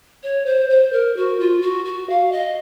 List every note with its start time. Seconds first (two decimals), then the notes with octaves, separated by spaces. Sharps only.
0.23 C#5
0.46 C5
0.70 C5
0.93 A#4
1.17 F#4
1.40 F4
1.62 F#4
1.85 F#4
2.10 F5
2.32 D#5